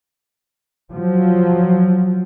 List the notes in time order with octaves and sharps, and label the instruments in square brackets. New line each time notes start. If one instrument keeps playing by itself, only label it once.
[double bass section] F3 F#3